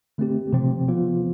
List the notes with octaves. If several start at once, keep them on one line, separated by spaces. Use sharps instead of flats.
D3 A3 C4 G4
C3 F3 C4
F3 B3 F4